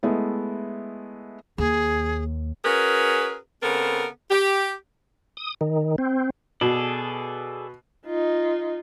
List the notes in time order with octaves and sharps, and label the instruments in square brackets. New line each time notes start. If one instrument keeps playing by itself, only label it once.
[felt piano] G#3 A3 B3 E4
[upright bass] D#2 [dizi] G#4
[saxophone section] C#4 F#4 G#4 A#4 B4
C#3 B3 C4 A4 A#4
G4
[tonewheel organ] D#6
D#3
C4
[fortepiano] B2 [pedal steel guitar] G#4 A4 D5
[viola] D#4 F4